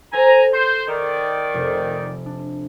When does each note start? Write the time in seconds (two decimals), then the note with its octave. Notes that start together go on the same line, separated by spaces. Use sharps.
0.13 A4 C5 G#5 A#5
0.53 C5 C6
0.88 D#3 D5 A#5
1.54 F1
2.26 D4